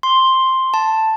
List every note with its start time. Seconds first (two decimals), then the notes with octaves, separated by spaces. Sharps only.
0.03 C6
0.74 A5